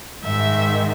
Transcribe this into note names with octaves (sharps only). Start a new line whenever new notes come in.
G#2 D#3 E5